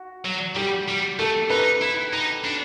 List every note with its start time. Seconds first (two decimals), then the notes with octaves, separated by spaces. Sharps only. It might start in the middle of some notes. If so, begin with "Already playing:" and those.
Already playing: F#4
0.25 F#3
0.56 G3 G4
0.88 G3
1.19 A3 A4
1.50 D#4 B4
1.81 E4
2.13 D#4
2.44 D4